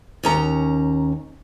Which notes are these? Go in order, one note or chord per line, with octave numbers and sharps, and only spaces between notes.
D#2 C#4 A#5